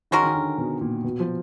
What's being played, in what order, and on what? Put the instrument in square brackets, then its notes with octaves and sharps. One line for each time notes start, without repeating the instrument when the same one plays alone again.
[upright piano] D#3 [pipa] G#3 C#4 F#4 A#4
[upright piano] D#3
D3
B2
A#2
B2
F3